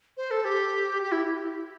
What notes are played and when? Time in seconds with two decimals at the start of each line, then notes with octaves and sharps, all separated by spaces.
0.17 C5
0.31 A4
0.44 G4
1.02 G4
1.12 E4